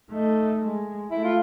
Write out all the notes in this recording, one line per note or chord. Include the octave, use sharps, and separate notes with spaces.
A3 D#4
G#3
A3 E4
F4